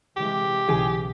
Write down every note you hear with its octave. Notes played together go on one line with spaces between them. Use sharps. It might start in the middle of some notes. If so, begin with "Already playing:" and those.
C3 E3 G#3 G4
B1 C#3 E3 G#4